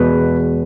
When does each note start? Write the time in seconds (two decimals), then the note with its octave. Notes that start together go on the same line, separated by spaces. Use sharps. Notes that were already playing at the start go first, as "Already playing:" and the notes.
Already playing: E2 B2 G#3 B4